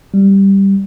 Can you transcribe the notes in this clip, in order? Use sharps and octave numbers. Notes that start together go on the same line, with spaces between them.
G3